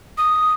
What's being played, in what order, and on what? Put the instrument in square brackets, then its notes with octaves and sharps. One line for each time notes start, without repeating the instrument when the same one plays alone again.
[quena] D#6